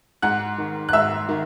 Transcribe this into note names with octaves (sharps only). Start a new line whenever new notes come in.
G#2 F#5 F#6
D#3
F#6
G#2 E5 E6
D#3